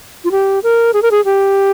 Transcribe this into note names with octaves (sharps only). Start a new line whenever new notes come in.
F4
G4
A#4
G#4
A#4
G#4
G4